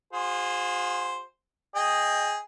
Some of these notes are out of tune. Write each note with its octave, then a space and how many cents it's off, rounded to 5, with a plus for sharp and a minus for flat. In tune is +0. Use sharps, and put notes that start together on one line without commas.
F4 +40 G#4 -20 C5 +0
G#4 +0 D#5 +0 G5 +15